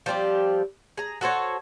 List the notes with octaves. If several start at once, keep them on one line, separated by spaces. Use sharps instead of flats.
F3 G3 C4 G4
G#4 A#5
F#4 A4 C5 C#5